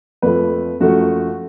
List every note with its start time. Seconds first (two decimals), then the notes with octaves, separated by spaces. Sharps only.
0.22 F2 F3 A3 B4
0.80 F#2 F3 A3 F#4